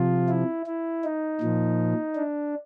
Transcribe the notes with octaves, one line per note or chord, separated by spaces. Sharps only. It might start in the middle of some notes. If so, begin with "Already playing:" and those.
Already playing: C3 F3 F4
E4
E4
D#4
A#2 F3
D4